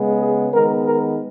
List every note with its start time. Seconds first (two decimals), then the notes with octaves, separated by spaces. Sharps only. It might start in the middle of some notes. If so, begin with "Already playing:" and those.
Already playing: C#3 G#3 B3
0.20 G#4
0.52 D#3 G#3 B3 A#4
0.86 A#4